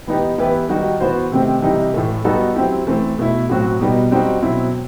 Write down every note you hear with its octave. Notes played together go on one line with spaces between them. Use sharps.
E3 B3 D#4 G4
E3 B3 E4 G4 B4
D#3 G3 D#4 F#4
E3 B3 F#4 C5
C3 D#3 A3 C4
C3 E3 G3 D#4 G4
A2 E3 A3
G3 B3 D#4 F#4 A4
F#3 C4 E4 G4
E3 A3 C4
B2 A3 E4
A2 F#3 C4 F#4
B2 G3 B3 D#4
G3 C4 D#4 F#4
B2 F#3 C4 E4